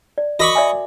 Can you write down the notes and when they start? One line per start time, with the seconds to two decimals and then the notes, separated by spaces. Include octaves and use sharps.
0.18 D5
0.40 F#4 A#4 D#5 B5 C#6 D6
0.55 D5 E5 G#5